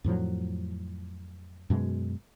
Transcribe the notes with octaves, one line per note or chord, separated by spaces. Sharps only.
F2 A2 F3 F#3
F#2 B2 G#3